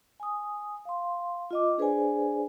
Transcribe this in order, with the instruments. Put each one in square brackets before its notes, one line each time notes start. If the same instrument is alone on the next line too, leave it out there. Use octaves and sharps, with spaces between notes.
[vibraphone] G#5 D#6
F5 C6
F4 D#5 D6
D4 G#4 B4 C5 D5 G#5